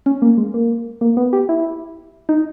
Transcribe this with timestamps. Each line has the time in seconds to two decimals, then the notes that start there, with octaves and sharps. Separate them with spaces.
0.06 C#4
0.22 A#3
0.38 G#3
0.54 A#3
1.01 A#3
1.17 B3
1.33 G4
1.49 E4
2.29 D#4